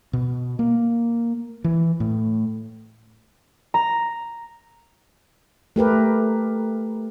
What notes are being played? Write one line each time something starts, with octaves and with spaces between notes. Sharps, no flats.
B2
A#3
E3
A2
A#5
A3 G4 A#4 B4